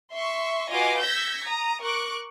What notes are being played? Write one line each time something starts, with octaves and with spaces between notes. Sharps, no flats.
E5 C6 C#6
F4 F#4 B4 D#5 G#5 D6
E6 G6 G#6 A#6 B6 C#7
A#5 D#6
A#4 C#6 D6 F#6